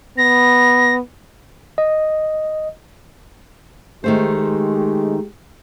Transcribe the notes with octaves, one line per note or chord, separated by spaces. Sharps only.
B3 A#6
D#5
D#3 G#3 A3 G4 C5